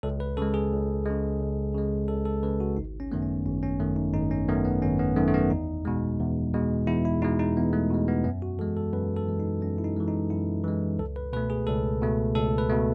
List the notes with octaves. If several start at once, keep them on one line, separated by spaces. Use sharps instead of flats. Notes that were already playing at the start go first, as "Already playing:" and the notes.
C#2 A4
B4
C#3 G#3 A4
G#4
C#2
C#3 G#3
C#2
C#3 G#3
C#2 A4
A4
C#3 G#3 B4
F#4
G#1 D#4
C#4
F#2 D#3 A3 B3
C#4
G#1 C#4
C#4
F#2 D#3 A3
D#4
G#1 D#4
C#4
F#2 D#3 A3 B3
B3
G#1 C#4
B3
F#2 D#3 A3
A3
B3
E2 D#4
B2 G#3
E2
B2 G#3
E2 E4
E4
B2 G#3 D#4
D#4
E2 B3
A3
B2 G#3
B3
F#2 B3
F#4
E3 G#3 A4
A4
F#2 B4
A4
E3 G#3
D#4
F#2 C#4
E4
D#4
E3 G#3
D#4
F#2 E4
E3 G#3
C#2 A4
B4
B2 A3 B4
G#4
C#2 A4
B2 A3
C#2 A4
B4
B2 A3